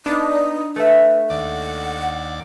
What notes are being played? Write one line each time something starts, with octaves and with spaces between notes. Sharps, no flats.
B3 D4 D#4
A3 B4 E5
D#2 D5 F#5